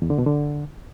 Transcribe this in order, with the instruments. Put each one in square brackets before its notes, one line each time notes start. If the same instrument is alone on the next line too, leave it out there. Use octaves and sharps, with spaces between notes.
[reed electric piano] E2
D3
B2
D3